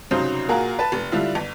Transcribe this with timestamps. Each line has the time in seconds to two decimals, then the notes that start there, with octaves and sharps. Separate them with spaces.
0.11 C2 C#3 F#3 D#4 C5
0.49 A#2 F#4 G#4 A#4 F5
0.79 B4 A5
0.92 F1
1.12 D3 G3 D4 E4 F4
1.35 G1